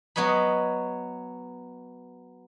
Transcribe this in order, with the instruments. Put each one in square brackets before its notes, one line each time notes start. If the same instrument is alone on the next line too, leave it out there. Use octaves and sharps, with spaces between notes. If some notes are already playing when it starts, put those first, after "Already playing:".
[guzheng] F#3 B3 C#5 D#5 B5